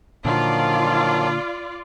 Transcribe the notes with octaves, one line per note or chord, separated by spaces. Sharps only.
A#2 D3 D#3 F3 F#3 F4 D5